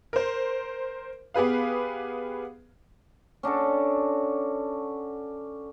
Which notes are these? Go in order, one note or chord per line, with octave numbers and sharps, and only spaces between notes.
A#4 C5
B3 G4 G#4 B4 F5
C#4 D4 F#4 A4